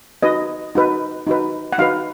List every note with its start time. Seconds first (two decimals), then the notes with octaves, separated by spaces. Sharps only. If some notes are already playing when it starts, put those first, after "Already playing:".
0.23 D#4 F#4 B4 D#5
0.75 D#4 F#4 B4
1.27 D#4 F#4 B4
1.72 F#5
1.78 D#4 F#4 B4 F5